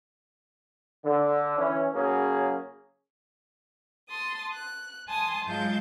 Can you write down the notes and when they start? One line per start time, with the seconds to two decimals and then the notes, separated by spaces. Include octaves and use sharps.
1.05 D3
1.59 E3 C#4
1.95 C#3 F#3 A#3 C#4 G#4
4.08 A5 C6 D#6
4.53 F#6
5.08 G#5 A5 C6 D#6
5.46 G#2 F#3 G#3 F4 A5 G6